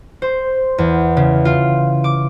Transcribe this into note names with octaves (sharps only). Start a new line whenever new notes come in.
C5
E2
C#3
F4
D6